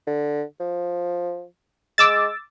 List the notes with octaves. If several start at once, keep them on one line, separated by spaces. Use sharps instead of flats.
D3
F3
G#3 D6 E6 A6